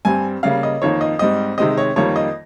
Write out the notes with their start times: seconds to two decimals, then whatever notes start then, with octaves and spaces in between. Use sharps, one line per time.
0.05 G2 G3 C4 G#5
0.43 C#3 G3 A#3 F5
0.63 D#5
0.82 F2 D#3 A#3 C#5
1.01 D#5
1.19 G#2 G3 C4 D#5
1.58 C3 D#3 G#3 C4 D#5
1.78 C#5
1.96 F2 D#3 G3 A#3 C#5
2.16 D#5